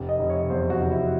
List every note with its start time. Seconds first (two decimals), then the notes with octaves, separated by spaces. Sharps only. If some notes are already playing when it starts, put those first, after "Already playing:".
Already playing: F1
0.09 D#5
0.19 F1
0.30 C#5
0.50 E2 C5
0.70 F#4
0.80 F1
0.91 E4